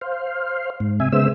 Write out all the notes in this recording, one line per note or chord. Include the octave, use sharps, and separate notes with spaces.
C5 F5
G#2
C3 E5 G#5
C#3 G#3 B3 C5 E5 E6